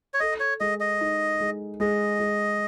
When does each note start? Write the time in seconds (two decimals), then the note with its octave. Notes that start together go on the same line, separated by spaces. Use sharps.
0.14 C#5
0.20 A4 D#5
0.40 C#5
0.60 G#3 D#5
0.80 D#5
1.01 D#4
1.40 G#3
1.80 G#3 D#5
2.20 G#3